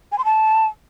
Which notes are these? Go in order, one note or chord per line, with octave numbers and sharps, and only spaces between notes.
G#5
C6
A5